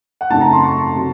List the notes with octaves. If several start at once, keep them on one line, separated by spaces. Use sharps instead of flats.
F#5
F#2 C#3 A3 C4 D#4 A5
A#5
C6
C#6
C3 F#3